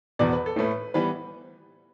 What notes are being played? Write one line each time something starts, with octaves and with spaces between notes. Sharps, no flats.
E2 B2 B3 D5
B4
A4
A2 A3 B4
E3 G3 B3 B4